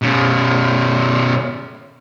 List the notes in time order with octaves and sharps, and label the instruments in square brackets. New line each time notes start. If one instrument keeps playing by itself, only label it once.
[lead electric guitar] B2 C#4